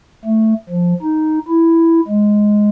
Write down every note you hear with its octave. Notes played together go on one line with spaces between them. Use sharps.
A3
F3
D#4
E4
G#3